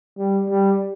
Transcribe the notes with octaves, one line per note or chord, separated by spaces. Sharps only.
G3
G3